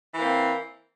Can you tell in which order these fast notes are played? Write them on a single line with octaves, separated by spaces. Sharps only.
E3 A#3 C4